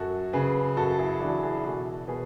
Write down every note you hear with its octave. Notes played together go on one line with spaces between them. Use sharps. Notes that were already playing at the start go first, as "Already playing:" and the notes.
Already playing: F#2 F#4 A4
C#3 G#4 B4
F#2 F#4 A4
E4 G#4
E3 D4 F#4
E4 G#4
B2 F#4 A4
B2 G#4 B4